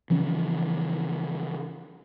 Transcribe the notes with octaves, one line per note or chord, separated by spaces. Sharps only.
C#3 E3 F3 C#4